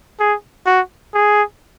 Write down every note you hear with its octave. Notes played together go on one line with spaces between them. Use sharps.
G#4
F#4
G#4